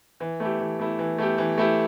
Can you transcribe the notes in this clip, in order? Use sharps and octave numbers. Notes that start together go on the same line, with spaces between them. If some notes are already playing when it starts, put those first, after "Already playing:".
E3
A3 E4 G4
E3
A3 E4 G4
E3
A3 E4 G4
E3
A3 E4 G4